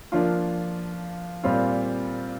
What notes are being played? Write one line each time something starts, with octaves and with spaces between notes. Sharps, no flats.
F3 A#3 D4 F4
A#2 G3 C4 F4